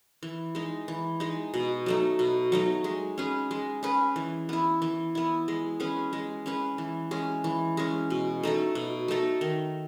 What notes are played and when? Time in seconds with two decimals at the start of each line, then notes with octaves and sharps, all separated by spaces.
0.23 E3
0.55 G#3 D#4
0.88 E3
1.20 G#3 D#4
1.54 B2
1.86 F#3 A3 D#4
2.19 B2
2.52 F#3 A3 D#4
2.84 G#3
3.18 C#4 G#4 B4
3.51 G#3
3.83 C#4 G#4 B4
4.16 E3
4.49 B3 E4
4.82 E3
5.15 B3 E4
5.48 G#3
5.80 C#4 G#4 B4
6.13 G#3
6.46 C#4 G#4 B4
6.78 E3
7.11 G#3 C#4
7.44 E3
7.77 G#3 C#4
8.10 B2
8.43 A3 D#4 A4
8.75 B2
9.08 A3 D#4 A4
9.41 D#3